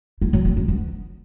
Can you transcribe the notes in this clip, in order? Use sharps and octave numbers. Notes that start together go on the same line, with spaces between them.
E4
F#3
C4
C#4
B3